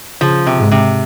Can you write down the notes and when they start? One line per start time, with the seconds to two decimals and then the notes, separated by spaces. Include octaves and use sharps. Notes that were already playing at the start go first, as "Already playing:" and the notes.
0.21 C#3 F3
0.47 C3
0.58 G#2
0.71 C3